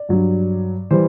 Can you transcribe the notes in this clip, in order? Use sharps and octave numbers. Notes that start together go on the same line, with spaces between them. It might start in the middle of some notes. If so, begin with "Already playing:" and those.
Already playing: D5
G2 F#3
E3 G3 C5